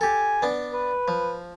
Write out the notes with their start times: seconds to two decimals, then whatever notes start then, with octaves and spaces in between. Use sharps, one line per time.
0.01 G4 A4 G#5
0.42 B3 D4
0.73 B4
1.08 F3